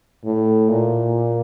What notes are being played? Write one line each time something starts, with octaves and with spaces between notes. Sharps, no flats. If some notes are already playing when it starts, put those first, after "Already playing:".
A2
A#2